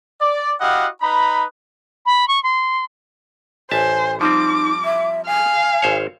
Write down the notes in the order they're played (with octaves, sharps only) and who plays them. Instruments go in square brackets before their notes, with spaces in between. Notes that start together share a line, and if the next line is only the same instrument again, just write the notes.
[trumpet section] D5
E4 F#4 G4 D#5 F5 F#5
D#4 B4 A#5 B5
[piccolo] B5
C#6
C6
[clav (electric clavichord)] A1 E5 A5 [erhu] C5 [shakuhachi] G#5
[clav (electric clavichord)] F3 G3 C4 [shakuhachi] D#4 [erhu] D6
[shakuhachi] E5
[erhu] F5 [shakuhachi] G#5
[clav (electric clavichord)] G#1 C5 C#5